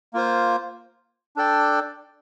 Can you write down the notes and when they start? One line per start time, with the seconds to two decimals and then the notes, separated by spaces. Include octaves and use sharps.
0.13 A#3 F4 C5
1.36 D4 A4 D5 G5